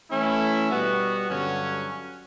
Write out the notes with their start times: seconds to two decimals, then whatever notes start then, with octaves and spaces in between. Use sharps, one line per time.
0.10 E3 A3 C#4 E4
0.69 B2 G3 B3 F#4
1.29 G2 D3 F#3 C#4